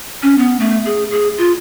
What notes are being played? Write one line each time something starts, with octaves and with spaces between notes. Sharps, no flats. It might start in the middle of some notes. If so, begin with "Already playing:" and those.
C#4
B3
A3
G#4
G#4
F4